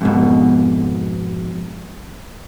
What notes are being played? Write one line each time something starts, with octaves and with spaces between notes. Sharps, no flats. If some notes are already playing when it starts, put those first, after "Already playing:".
F2 G#2 B2